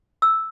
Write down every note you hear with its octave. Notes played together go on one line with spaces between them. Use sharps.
E6